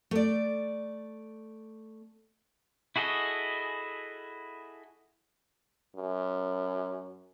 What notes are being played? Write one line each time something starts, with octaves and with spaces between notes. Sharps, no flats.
A3 D5
E4 F#4 G#4 A4 D#5
F#2